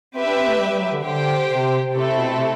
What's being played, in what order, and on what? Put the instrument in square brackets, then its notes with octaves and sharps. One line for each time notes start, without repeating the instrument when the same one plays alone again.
[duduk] C4 [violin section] G4 B4 E5
[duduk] D4
C4
A3
G3
G3
F#3
D3
[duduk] D3 [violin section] G4 C5 G5
[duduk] C3
[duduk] C3 [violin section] A3 C4 E4 A4
[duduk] B2
C3